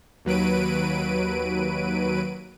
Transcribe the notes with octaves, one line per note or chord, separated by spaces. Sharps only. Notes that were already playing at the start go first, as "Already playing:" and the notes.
D#2 F#3 B4 D7 D#7